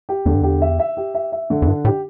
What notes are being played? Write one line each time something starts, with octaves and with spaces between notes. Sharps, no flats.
G4
E2 D3
G2
E2 G4
E5
E5
G4
E5
E5
D3
E2
G2 D4
A2 G4